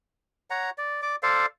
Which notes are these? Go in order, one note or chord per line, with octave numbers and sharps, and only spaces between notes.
C#5 F#5 A#5
D5
D5 D6
A4 C5 D5 F5